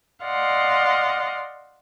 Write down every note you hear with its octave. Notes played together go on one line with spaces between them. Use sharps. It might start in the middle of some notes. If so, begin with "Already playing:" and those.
D5 D#5 F5 F#5 C6